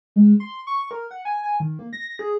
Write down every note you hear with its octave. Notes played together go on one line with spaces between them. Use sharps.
G#3
C6
C#6
A#4
F#5
G#5
G#5
D#3
A#3
A#6
G#4